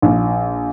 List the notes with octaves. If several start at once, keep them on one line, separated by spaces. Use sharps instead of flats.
A#1